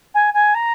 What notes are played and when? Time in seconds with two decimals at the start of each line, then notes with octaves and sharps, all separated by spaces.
0.14 G#5
0.34 G#5
0.54 A#5